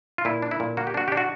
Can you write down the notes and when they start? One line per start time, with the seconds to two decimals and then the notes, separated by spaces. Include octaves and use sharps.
0.18 F4
0.25 A#2 E4
0.42 D4
0.51 E4
0.60 A#2
0.77 A#3 F#4
0.87 G4
0.94 D4 F#4
1.08 D4 G4
1.17 F#4